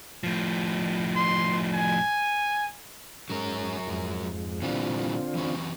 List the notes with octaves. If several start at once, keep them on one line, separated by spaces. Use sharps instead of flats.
A2 F3
C6
G#5
G#2 F#3 C#4 A#4
F2 G#2
A#2 D3 E3 G3 C4 F4
E3 F#3 C#4